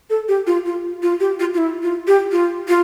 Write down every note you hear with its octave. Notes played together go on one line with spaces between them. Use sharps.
A4
G4
F4
F4
F4
G4
F4
F4
E4
F4
G4
F4
F4